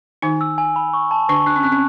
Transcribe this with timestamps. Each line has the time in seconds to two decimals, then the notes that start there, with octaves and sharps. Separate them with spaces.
0.22 D#3 D#4 G#5
0.41 E6
0.58 G#5
0.76 B5
0.93 C#6
1.11 A5
1.29 D3 D4 C#6
1.46 D4 F#6
1.56 C#4
1.63 C4 F#6
1.72 C#4